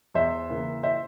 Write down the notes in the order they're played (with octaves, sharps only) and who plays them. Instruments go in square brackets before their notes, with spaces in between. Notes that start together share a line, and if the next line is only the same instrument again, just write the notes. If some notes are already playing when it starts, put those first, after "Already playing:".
[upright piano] E2 C5 E5
C#3 E3 A#3
C5 E5